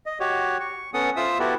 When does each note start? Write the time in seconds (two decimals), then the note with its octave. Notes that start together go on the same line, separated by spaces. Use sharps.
0.06 D#5
0.20 F#4 G4 C#5
0.60 C#6
0.94 B3 C#4 A4 F#5 D#6
1.17 F4 C5 E5 D#6 E6
1.40 B3 E4 F#4 G4 A4